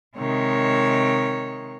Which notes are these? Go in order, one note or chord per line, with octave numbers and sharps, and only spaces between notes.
C3 D#3 G#3 C#5